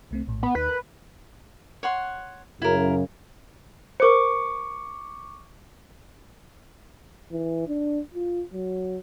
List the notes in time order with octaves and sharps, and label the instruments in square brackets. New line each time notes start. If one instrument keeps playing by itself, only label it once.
[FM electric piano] C2 A3 C4
A#1 A2
[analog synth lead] B3
[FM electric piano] D#2 D#4 [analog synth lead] B4
[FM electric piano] A#4
[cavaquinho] C#5 F#5 C6
[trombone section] F#2 C#3 [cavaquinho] E4 A#4
[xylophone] A#4 C5 [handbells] C#6 D6 C#7
[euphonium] E3
D4
F4
F#3